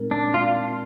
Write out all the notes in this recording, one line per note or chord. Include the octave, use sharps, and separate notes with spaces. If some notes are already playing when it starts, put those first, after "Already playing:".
Already playing: A#2 G#3 C4 D#4 A#4
D4
F4